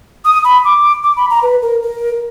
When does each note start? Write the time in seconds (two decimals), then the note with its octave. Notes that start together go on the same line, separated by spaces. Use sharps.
0.25 D#6
0.44 B5
0.65 D6
1.03 D6
1.17 B5
1.30 A#5
1.43 B4
1.62 A#4
1.82 A#4